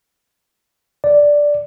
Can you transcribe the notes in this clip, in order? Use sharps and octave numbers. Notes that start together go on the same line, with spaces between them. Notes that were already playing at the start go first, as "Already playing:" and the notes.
D5